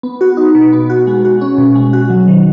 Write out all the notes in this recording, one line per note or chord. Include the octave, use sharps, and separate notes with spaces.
B3
F#4
D#4
B2
B3
F#4
G#3
F#4
C#4
B2
G#3
F#4
F#3
D#3